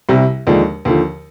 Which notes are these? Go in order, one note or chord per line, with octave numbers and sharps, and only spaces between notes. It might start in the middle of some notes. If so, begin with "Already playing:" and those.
C2 C3 G3
D#2 D3 F3 G#3 D4
D#2 D3 F3